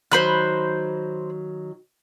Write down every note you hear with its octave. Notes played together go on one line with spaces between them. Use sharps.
D#3 F#3 C5 B5 F#6